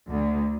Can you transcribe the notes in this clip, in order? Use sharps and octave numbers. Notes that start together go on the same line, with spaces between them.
D2